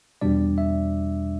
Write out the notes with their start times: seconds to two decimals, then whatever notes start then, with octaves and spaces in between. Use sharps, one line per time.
0.21 E2 B2 G3 D4 D5
0.58 E5